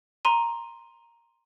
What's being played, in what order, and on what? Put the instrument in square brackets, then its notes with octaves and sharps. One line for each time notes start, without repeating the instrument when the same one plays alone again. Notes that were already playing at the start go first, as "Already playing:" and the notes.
[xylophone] A#5 C6 D#7